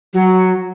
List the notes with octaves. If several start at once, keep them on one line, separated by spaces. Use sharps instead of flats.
F#3